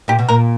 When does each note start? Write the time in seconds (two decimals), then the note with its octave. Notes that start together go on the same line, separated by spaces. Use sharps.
0.08 A#2 G4
0.19 B2
0.28 A#2 A#4